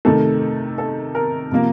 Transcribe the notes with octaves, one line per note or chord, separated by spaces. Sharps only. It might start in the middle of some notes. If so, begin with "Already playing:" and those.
C3 D#3 A3 A4
A4
A#4
C3 F3 A#3